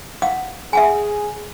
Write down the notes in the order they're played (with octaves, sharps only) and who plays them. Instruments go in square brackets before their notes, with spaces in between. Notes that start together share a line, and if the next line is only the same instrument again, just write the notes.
[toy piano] F5 F#5 D#6
[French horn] G#4 [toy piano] E5 F#5 G#5